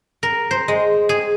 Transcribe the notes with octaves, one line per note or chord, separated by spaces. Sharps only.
A#4
C5
G#3
G#4